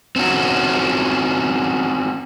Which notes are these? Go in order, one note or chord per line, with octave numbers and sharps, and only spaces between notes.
C4 C#4 D#4 F#4